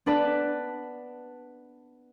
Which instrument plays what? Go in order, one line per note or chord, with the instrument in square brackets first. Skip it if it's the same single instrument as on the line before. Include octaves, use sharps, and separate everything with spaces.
[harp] B3 D4 B4 D5 A5